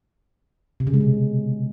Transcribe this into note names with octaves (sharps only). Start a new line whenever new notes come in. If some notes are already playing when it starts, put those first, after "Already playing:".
C3
C#3
G#3
B2